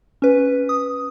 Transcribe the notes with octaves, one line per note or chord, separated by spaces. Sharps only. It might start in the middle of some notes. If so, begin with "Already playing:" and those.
C#4 B4
D#6